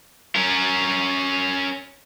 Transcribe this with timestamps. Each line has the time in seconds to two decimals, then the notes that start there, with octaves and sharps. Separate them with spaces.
0.36 C#4 A#4